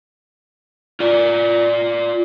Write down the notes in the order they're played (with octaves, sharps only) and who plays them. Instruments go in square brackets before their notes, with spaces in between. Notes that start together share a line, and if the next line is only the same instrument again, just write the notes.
[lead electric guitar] F4 D5